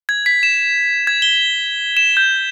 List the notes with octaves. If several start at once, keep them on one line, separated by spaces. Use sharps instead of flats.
G#6
B6
E7
G#6
G7
E7
G6